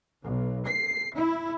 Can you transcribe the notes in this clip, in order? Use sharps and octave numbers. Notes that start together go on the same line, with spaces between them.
B1
C7
E4